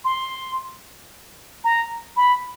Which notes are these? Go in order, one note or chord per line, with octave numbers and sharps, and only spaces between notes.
C6
A#5
B5